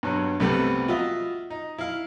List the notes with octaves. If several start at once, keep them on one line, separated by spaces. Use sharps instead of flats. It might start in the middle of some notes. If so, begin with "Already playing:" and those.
G2 B2 F#3
C2 C3 G3 A3 B3
F4 F#4 D#5 E5
D#4
E4 F5